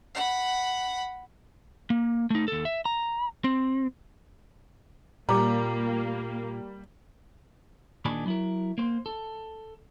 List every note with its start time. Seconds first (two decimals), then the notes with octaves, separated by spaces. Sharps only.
0.15 F#5 B5
1.90 A#3
2.30 A3 D#4
2.48 D#2 A4
2.65 E5
2.85 A#5
3.44 C4
5.29 A#2 G3 A#3 A#5 D6
8.05 D#2 A#2 D#3 D4 G#4 B5
8.26 F#3 E4 A#4
8.78 A#3 C5
9.06 A4